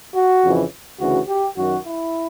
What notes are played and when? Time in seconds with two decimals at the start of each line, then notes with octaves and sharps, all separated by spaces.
0.13 F#4
0.42 F2 C#3 E3
0.99 D2 C#3 E3 F#4
1.27 G4
1.56 F#2 D#3 F#4
1.85 E4